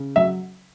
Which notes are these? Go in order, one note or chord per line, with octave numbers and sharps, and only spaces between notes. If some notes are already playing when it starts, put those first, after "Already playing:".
Already playing: C#3
F#3 E5